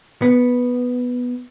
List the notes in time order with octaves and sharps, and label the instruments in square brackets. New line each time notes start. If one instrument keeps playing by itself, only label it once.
[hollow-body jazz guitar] B3